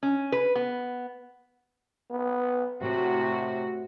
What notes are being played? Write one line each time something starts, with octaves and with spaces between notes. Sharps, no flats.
C#4
B4
B3
B3
A2 C3 F#4